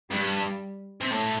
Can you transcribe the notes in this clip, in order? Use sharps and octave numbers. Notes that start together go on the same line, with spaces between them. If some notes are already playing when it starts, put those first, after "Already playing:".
G2 G3
C3
A2